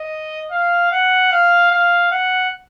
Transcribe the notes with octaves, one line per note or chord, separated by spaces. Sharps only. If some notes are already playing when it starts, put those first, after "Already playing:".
Already playing: D#5
F5
F#5
F5
F5
F#5